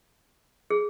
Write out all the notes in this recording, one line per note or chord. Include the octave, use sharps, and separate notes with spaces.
G#4